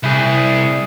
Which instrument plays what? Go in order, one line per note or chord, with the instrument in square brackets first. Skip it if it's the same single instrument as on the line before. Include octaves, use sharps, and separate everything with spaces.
[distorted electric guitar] C2 [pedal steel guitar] E4 G#4